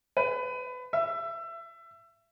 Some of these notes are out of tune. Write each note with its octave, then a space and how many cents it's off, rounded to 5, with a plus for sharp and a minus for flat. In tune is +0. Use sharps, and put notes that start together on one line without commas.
B4 +25
E5 +25